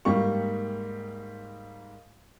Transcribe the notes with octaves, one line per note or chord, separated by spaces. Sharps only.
G#2 G3 A#3 D#4 G5 C#6